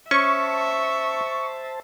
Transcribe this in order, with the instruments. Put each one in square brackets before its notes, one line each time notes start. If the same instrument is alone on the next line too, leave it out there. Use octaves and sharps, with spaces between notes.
[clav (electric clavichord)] C#4 [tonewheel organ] C5 A5 [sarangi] E5 [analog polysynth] C#6